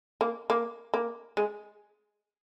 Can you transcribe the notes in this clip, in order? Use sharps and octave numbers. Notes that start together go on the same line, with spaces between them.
A#3
A#3
A#3
G#3